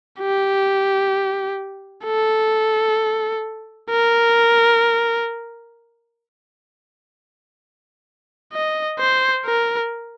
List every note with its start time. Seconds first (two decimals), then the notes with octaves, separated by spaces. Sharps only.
0.20 G4
2.05 A4
3.90 A#4
8.53 D#5
8.99 C5
9.46 A#4